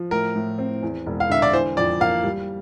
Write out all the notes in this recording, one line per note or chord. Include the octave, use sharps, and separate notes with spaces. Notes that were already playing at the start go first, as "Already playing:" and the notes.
Already playing: F3
A2 A#4
A2
C4
E2
E1
F5
D3 E5
D5
E3 C5
F2 D5
A#3 F5
G3